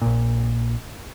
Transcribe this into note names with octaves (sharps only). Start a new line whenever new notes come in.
A#1 A#2